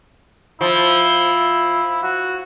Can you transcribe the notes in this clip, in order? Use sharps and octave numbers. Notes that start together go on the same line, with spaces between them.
F3 E4
F#4